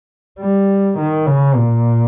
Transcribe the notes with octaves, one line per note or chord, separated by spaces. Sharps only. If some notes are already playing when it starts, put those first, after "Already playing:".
G3
D#3
C#3
A#2